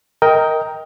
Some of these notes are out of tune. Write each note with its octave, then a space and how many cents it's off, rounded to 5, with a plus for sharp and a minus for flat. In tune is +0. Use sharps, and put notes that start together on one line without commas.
A#4 +0 D#5 +20 G5 +0